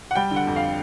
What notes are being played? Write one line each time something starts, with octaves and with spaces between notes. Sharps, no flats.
F#5
G3 G5
D3
F#5
F2
F5